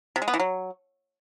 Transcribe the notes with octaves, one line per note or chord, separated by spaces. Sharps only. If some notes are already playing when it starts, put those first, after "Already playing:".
C3
G#3
B3
E3
F#3